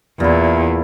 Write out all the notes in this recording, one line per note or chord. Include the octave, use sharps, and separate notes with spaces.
E2 A#2 E4